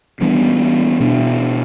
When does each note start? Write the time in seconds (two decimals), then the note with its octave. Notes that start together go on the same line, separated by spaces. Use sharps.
0.21 E3 G3 B3 D4
1.00 B2 B3 D4